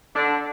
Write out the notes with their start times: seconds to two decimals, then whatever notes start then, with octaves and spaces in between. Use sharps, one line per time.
0.14 D3 D4